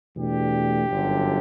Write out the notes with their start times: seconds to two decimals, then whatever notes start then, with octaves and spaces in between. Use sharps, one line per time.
0.16 E2 B2 A3 D4 G4
0.89 G1 F#2 D3